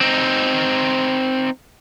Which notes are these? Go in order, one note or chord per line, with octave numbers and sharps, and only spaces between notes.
C4 D#4